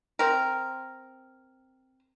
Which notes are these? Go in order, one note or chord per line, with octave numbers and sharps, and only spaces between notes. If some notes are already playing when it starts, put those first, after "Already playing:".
C4 A#4